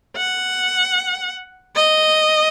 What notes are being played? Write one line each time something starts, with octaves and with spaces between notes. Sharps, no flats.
F#5
D#5